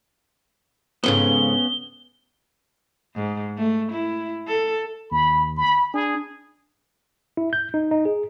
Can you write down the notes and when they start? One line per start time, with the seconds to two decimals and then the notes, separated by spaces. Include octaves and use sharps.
1.04 F2 G#2 C#3 B3 C#4 G7
3.15 G#2
3.57 A3
3.92 E4
4.48 A4
5.11 D#2 B5
5.57 B5
5.94 D4 G#4
7.37 E4
7.53 G6
7.74 D#4
7.91 D#4
8.05 G#4